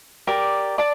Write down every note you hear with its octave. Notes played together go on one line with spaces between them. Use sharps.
G4 A#4 D5
D5 A5